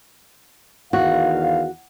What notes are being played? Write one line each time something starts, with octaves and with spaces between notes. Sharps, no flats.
E2 D#3 F#4 F5